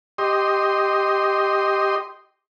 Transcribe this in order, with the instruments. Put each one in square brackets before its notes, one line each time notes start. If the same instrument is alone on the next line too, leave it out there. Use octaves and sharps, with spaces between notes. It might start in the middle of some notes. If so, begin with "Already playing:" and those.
[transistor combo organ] G4 D#5 C6